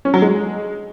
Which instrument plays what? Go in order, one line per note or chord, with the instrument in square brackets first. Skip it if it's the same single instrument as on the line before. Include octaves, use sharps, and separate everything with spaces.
[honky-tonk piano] C#4
F#3
G#3